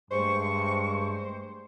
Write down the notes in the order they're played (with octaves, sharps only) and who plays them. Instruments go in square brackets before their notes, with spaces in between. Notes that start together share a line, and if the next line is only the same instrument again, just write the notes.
[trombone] G2 [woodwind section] G#3 A3 [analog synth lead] C5 [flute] C#6